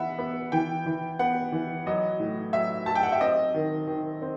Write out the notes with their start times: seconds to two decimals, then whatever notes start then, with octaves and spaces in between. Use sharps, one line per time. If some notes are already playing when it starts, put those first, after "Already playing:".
Already playing: E3 B3 E5 F#5 B5
0.18 B3
0.52 E3 G5
0.86 E3
1.19 B3 F#5
1.52 E3
1.86 F#3 D#5
2.20 A2
2.53 F#3 E5
2.86 F#3 A5
2.95 G5
3.03 F#5
3.12 E5
3.21 C4 D#5
3.54 D#3
3.88 D#3
4.22 C4